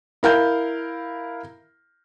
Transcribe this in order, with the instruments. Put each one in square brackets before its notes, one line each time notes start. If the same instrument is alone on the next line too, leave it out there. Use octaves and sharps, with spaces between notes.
[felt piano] E4 A#4 F5 G6